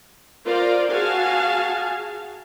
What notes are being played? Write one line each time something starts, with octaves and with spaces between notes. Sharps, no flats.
F4 A#4 C5 D5 F5
F#4 G#4 F5 G#5 A5